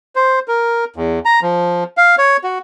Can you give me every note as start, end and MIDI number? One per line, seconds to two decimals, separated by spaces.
0.16 0.39 72
0.48 0.85 70
0.96 1.19 40
1.25 1.40 82
1.42 1.84 53
1.97 2.16 77
2.18 2.37 73
2.44 2.59 66